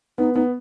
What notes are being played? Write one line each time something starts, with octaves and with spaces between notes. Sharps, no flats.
B3 D#4
B3 D#4